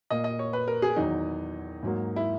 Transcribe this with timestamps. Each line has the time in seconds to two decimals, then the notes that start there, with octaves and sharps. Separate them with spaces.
0.10 A#2 A#3 D#5
0.24 D#5
0.39 C#5
0.53 B4
0.68 A#4
0.82 G#4
0.96 E2 D#3 F#3 D#4
1.83 G#2 F#3 A#3
2.16 E4